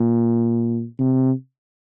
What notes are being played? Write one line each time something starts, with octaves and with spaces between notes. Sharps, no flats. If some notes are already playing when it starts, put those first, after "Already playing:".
Already playing: A#2
C3